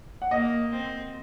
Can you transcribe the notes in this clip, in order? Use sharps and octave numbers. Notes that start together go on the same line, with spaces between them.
F#5
A#3 D#5
C4